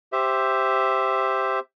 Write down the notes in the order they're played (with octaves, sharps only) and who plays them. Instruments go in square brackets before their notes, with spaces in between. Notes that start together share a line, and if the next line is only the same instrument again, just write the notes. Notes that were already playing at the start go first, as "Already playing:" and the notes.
[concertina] G4 C5 E5